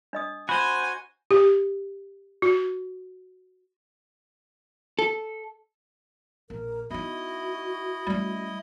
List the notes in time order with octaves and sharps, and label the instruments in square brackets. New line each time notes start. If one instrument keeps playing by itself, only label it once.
[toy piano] D4 D#5 D#6
[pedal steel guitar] F#4 C5 [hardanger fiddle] G#5 [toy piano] B5
[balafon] G4
F#4
[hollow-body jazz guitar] A4
[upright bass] A#1 [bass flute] A#4
[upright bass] B3 D#4 [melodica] E4 D#5 [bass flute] F#4
[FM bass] G3 [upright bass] A3 C#4